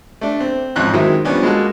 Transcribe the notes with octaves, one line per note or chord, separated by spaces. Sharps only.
A3 D4
C4
G#1 F2 C#4 F#6
D#3 F#3 G#3 C4 E4
F3 G3 B3 C#4 D4
G#3 A#3 F#4 A4